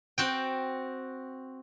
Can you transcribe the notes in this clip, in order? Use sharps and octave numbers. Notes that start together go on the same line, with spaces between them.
C4 F#4 G5